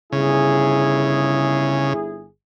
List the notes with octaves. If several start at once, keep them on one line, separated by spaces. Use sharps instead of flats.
G1 C#3 E4 G#4